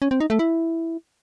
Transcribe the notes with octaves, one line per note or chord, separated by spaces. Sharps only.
C#4
C4
D#4
A3
E4